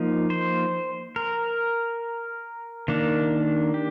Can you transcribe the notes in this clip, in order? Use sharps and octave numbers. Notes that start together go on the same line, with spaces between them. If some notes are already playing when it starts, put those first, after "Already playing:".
Already playing: F3 A#3 D#4
C5
A#4
D#3 A#3 D4
G4